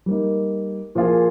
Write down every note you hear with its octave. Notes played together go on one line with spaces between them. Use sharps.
G3 A#3 D#4
A#2 F3 A#3 F4 G#4